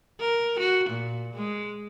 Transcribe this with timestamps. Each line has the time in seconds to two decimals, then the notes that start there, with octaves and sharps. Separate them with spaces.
0.21 A#4
0.59 F#4
0.90 A#2
1.34 G#3